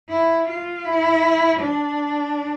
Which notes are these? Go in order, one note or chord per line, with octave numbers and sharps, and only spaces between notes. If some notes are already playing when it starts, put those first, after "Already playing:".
E4
F4
E4
D4